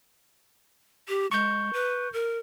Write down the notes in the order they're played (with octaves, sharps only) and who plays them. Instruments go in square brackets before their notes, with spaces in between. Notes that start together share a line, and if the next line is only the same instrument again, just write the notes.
[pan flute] G4
[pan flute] G#3 [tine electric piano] C#6 G6
[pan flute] B4
A#4